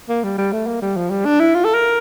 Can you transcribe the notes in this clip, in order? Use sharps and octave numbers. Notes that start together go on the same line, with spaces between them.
A#3
G3
G3
A3
A#3
G3
F3
G3
D4
E4
F4
A4
A#4